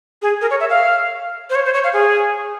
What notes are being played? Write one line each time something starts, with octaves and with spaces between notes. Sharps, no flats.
G#4
A#4
C#5
E5
F5
C5
C#5
C5
C#5
F5
G#4